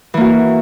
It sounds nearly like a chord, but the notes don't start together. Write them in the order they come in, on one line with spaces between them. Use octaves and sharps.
E3 A#3 F#4